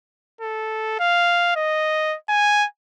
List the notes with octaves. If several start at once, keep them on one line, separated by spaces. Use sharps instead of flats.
A4
F5
D#5
G#5